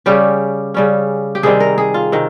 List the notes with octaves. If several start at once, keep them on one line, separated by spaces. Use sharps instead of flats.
C#3 G3 C#4 G4
C#3 G3 C#4
G4
C3 D#3 G3 C4 G#4
A#4
G#4
F4
C3 D#3